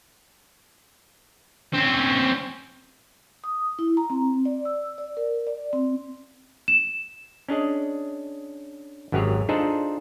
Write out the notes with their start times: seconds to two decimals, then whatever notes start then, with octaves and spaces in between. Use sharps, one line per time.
1.74 C4 C#4
3.44 D#6
3.79 E4
3.97 A#5
4.10 C4
4.45 D5
4.65 E6
4.98 D5
5.17 A#4
5.47 D5
5.73 C4
6.68 E7
7.49 C#4 D4 G#4 D#5
9.12 G#1 F#2 F#3 G4 G#4 C#5
9.49 D4 D#4 F4 G#4 A4 C5